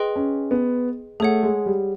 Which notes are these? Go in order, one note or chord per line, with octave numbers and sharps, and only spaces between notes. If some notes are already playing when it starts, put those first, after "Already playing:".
Already playing: G#4 B4 D#5 G5 C6
C#4
B3
A3 G#4 C#5 F#5
G#3
G3